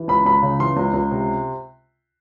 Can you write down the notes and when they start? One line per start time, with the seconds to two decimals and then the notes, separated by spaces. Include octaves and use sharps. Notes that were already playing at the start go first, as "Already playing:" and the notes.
Already playing: E3
0.08 C#2 B5
0.25 C#2 B5
0.43 C#3
0.59 E3 C6
0.77 C#2
0.94 C#2
1.11 C3